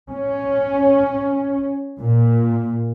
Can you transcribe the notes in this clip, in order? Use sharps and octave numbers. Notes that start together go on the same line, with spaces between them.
C#4
A#2